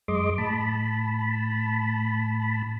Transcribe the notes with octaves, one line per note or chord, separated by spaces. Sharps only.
F#2 G#3 D#5 C6 D6
A2 A5 B5